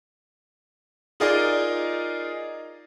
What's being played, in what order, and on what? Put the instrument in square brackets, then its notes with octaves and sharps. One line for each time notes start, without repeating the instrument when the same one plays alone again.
[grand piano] D#4 F4 G#4 A#4 D5 D#5